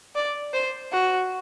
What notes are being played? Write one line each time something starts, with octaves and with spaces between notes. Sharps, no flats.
D5
C5
F#4